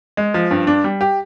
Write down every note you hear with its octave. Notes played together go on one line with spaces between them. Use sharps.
G#3
F3
G2
D4
G3
G4